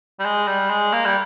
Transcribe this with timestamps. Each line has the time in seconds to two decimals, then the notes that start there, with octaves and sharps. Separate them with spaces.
0.19 G3
0.25 G#3
0.47 G3
0.69 G#3
0.92 A#3
1.05 G3